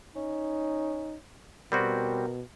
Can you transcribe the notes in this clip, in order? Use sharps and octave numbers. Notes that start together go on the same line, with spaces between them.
C#4 D#4
B2 G3 C4 F#4 A#4